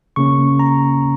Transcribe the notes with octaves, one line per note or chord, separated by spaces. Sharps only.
C#3 A#3 C#4 C#6
A#5